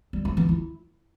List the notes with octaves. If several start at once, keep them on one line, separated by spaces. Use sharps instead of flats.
G3
C4
E3
E4